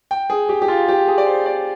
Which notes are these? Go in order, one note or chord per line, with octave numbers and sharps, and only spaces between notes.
G5
G#4
G4
G4
F4
G4
G#4
D5
C5
D5